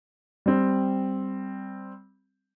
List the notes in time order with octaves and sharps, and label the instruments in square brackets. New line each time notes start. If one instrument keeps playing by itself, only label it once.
[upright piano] G3 C4